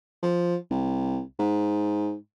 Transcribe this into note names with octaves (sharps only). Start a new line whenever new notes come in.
F3
C2
G#2